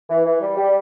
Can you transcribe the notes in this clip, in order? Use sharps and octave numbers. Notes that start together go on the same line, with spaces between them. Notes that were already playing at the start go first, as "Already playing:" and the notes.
E3
E3
G3
G3